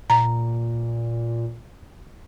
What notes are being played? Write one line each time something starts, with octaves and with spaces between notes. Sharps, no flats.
A#2 A#5